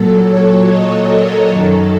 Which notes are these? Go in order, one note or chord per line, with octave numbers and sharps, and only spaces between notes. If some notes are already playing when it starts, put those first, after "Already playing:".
Already playing: A#2 F#3 A4
C#5
D#5
A#4
F#2 D#3 F#3 A4